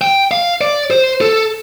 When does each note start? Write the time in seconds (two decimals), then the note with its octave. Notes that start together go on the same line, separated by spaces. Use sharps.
0.02 G5
0.31 F5
0.61 D5
0.91 C5
1.21 A4